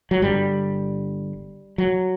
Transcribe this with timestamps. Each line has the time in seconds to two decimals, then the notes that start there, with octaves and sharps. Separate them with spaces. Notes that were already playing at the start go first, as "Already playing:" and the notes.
0.11 F#3
0.22 G1 G2 D3 G3
1.78 F#3